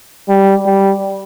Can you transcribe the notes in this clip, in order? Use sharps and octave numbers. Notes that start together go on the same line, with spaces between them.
G3
G3